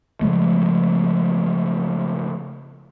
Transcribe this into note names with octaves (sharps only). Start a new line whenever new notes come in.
C#3 F3 G#3 A3